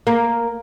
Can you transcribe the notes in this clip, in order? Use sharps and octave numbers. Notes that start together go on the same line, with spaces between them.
A#3